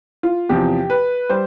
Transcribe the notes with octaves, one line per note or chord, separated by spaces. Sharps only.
F4
E2 C3 F3 G4
B4
G3 C5